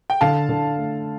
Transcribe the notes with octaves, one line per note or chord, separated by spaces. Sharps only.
G5
D3 F5 A5
D3
A3